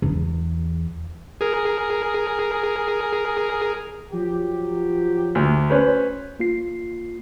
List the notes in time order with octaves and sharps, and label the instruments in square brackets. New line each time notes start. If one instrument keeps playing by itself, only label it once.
[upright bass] E2
[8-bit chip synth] G#4 A#4
[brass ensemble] F3 F#3 G4
[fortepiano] D2
C#4 B4 C5
[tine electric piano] A#3 F4 C7